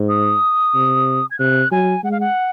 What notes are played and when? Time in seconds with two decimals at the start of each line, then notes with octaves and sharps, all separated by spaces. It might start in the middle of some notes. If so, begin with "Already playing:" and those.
Already playing: G#2
0.09 D#6
0.74 C3
1.31 G#6
1.39 C3 F#6
1.71 F#3 G#5
2.04 G#3 F#5
2.12 F5
2.20 F#5